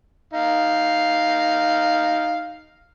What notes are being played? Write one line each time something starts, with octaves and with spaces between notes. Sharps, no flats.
D#4 F5